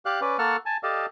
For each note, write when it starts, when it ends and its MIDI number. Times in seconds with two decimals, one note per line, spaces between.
0.05 0.20 67
0.05 0.20 74
0.05 0.20 77
0.05 0.20 90
0.21 0.37 61
0.21 0.37 71
0.21 0.37 74
0.39 0.56 58
0.39 0.56 69
0.39 0.56 78
0.39 0.56 81
0.39 0.56 85
0.39 0.56 89
0.66 0.77 80
0.66 0.77 81
0.83 1.06 67
0.83 1.06 69
0.83 1.06 74
0.83 1.06 75
0.83 1.06 77
0.83 1.06 81